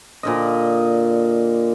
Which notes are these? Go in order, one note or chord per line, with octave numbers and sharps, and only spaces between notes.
A#2 D3 D#5